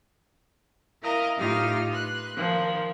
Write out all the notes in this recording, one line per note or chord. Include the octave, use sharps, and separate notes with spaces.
E4 A#4 D#5 F5 A#5
A2 D#4 F4 G4 D#6 F6
B4 C6 F#6
D#3 F3 A#4